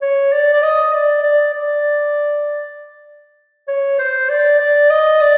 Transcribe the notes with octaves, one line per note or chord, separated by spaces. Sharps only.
C#5
D5
D5
D#5
D5
D5
D5
C#5
C5
D5
D5
D#5
D5